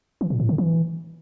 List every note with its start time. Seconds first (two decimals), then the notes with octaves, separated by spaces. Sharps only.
0.21 E3
0.30 A#2
0.40 A2
0.49 D3
0.58 E3